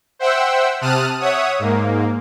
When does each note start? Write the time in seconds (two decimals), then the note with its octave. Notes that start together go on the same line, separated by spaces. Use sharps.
0.19 C5 E5 F#5 G5 E6
0.81 C3 A5 D#6 F6 F#6 D#7
1.20 C#5 E5 F#5 D#6
1.59 G#2 A#3